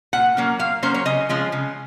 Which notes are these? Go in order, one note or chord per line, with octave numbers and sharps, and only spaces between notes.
A#2 F#5
F#3 A#3 C#4
A#2 F5
F#3 A#3 C#4 C5
C#5
C#3 D#5
F3 G#3 C#4 F4
C#3